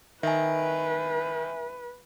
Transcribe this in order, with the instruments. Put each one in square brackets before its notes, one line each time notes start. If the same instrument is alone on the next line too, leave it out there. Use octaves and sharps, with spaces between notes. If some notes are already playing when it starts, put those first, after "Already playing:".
[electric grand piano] D#3 [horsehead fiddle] B4 [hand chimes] E5 G#5